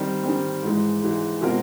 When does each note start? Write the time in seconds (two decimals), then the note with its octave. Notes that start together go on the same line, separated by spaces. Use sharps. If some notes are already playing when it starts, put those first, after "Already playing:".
Already playing: D#3 G3 C4
0.23 D#3 G3 C4
0.63 G#2 E3 G#3
1.02 G#2 E3 G#3
1.41 B2 G#3 C4 F4 A#4